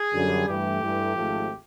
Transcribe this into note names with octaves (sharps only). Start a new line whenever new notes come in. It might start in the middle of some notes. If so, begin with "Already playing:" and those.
Already playing: G#4
F#2 D3 G3
G2 E3 A3 G4
G2 E3 A3
G#1 G#2 F3 A3